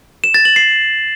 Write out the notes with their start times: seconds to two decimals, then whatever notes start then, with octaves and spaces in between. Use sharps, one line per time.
0.24 E7
0.34 A6
0.45 F#7
0.56 C7